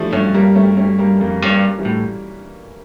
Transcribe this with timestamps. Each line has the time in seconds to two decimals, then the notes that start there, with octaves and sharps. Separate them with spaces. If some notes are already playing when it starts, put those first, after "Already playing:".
Already playing: E3 F3 G3 A3
0.13 G2 A3 C#4
0.34 G3 A#3
0.55 A3 C#4
0.77 A3 C#4
0.99 G3 A#3
1.20 F2 G3 A#3
1.42 G2 C#4
1.49 G3 A#3
1.78 E3 G3
1.85 A2